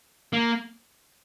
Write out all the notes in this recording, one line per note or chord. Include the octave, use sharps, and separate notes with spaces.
A#3